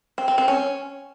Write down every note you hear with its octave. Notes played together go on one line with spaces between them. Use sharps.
C4
C4
C4
C#4